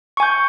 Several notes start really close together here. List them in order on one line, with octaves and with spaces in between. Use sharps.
C#6 G#5 G6